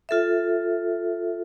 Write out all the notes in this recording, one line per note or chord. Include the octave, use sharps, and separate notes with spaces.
F4 A4 E5